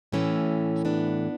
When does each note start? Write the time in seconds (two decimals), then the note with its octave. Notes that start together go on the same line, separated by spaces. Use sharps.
0.12 A2 E3 A3 C#4
0.85 B3 D4